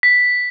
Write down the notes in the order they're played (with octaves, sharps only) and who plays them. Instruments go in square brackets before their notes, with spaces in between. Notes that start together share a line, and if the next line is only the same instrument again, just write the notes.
[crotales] B6